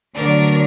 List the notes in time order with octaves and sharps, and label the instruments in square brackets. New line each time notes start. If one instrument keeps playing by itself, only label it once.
[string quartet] D2 D3 F#3 A#4 D5